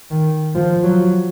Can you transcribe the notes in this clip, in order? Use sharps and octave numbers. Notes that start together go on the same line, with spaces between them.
D#3
F3
F#3